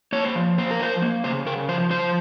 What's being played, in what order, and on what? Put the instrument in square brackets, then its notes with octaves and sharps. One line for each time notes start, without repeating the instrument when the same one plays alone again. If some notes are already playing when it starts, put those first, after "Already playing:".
[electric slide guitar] A#3 C#5
C5
F3
A#3 C5
A#4
F3 C5
A#3
C#3 C5
C#3 A#4
F3 C5
F3 C5